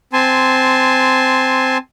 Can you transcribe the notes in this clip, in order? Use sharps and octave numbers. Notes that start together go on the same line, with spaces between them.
C4 G#5 A5 C6